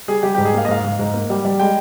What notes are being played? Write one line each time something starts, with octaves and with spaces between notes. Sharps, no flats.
G3 G#4
G3 G4
G#2 G4
G#4
A#3 F5
D#5
G#2 F5
G#2
G#2
A#3
G3
G3
G#3 G5